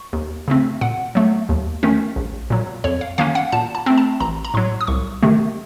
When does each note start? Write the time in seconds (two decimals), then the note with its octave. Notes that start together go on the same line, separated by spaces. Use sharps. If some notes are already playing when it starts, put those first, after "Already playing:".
Already playing: C#6
0.13 D#2
0.48 C#3 A3 C4
0.81 A#2 F#5
1.15 F#3 A3
1.49 D#2
1.83 D#3 A3 C#4
2.16 A#1
2.50 A#2 F#3
2.84 F2 C#5
3.01 F5
3.18 D#3 A#3 C#4 F5
3.35 F#5
3.52 A#2 A5
3.75 A5
3.86 A3 C4
3.98 A5
4.20 A1 A#5
4.45 A#5
4.54 A2 F#3 C6
4.81 D#6
4.87 C2 C#6
5.23 C3 D#3 A3